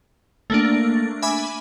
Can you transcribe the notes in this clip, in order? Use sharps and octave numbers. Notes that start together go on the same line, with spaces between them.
A3 A#3 D4
E5 G#5 B5 D6